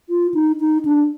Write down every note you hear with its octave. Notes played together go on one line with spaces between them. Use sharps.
F4
D#4
D#4
D4